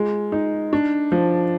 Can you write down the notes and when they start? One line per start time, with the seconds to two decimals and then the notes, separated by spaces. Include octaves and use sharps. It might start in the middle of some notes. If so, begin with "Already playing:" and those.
Already playing: G#3 F4
0.32 D#4
0.73 D4
1.12 F3